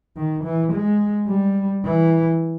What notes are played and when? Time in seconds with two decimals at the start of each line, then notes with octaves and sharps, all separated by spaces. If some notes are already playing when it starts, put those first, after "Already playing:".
0.17 D#3
0.44 E3
0.72 G#3
1.28 G3
1.84 E3